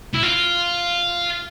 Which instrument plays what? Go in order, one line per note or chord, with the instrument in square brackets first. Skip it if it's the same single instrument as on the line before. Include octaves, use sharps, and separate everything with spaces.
[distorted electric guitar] E4
F4